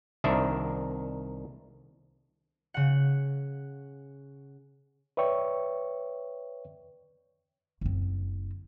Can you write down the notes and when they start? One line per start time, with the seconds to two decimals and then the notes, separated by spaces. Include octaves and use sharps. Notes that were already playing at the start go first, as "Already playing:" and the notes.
0.24 C2 D#3 D4 A#4 E5
2.74 C#3 F#5
5.17 B4 C#5 D5 E5 G5 C#6
7.81 F#1 C4